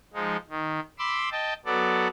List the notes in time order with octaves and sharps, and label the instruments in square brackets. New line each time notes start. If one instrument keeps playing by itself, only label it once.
[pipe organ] F3 G#3 D#4
D#3
B5 C6 D6 E6
D#5 G5 A5
F#3 B3 A4 D5